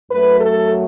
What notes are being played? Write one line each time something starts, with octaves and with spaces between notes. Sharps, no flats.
F#2 F#3 A3 B4
A4